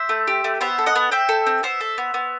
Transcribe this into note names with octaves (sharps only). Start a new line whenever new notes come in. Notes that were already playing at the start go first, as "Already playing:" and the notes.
Already playing: C5 E5
A3
G4
A3
B3 C5 E5
A4
D#5 F#5
B3
C4 E5 G5
A4
C4
B3 C5 E5
A4
B3
B3